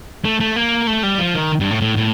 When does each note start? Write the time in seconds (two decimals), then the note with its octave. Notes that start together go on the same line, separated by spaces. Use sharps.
0.25 A3
0.40 A3
0.56 A#3
0.87 A3
1.03 G3
1.19 F3
1.34 D#3
1.60 G2
1.71 A2
1.81 A2
1.97 A2